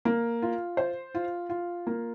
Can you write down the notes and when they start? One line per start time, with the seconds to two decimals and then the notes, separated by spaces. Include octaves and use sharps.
0.05 A#3
0.42 F4
0.77 C5
1.15 F4
1.49 F4
1.87 A#3